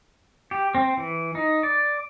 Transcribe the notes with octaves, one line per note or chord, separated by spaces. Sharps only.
G4
C4
E3
D#4
D5